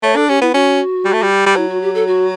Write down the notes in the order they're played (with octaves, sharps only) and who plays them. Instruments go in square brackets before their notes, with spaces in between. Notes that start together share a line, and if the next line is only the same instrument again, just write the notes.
[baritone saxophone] A3 [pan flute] C#5
[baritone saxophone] D4 [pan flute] A4
[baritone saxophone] C#4 [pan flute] G4
[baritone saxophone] B3 [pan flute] E4
[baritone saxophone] C#4 [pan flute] F#4
[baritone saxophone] G3
A3
G3
G3
[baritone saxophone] F#3 [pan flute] E4
[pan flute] F#4
G4
A4
F#4